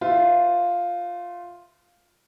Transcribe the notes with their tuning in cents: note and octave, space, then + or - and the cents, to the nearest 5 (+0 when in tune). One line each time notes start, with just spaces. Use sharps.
F4 +5 C5 -40 E5 +0